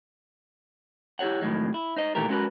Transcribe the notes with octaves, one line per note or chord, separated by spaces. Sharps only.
E4 G4 A#4 C#5 F#5
F2 A2 D#3 F#3 G#3
E4
D#4 C5 D#5
A#2 D#3 E3 A3 G4 A#4
G#3 B3 C#4 F#4 A#4 B4